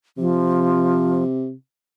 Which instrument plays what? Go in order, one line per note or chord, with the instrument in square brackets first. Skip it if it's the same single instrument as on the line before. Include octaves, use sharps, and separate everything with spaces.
[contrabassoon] C3 [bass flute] F3